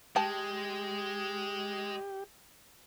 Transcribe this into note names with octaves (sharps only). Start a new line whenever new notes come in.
G#3 G4 G5 A5